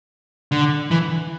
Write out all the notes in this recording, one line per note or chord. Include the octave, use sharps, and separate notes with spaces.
D3
E3